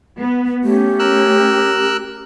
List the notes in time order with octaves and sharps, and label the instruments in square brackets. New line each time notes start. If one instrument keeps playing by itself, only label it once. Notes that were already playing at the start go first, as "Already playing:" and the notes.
[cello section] B3
[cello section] A3 C#4 [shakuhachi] G4
[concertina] A#4 E6 F#6